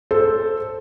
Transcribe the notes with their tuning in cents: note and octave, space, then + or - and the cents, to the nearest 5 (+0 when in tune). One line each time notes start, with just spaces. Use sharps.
A4 +0 C5 +0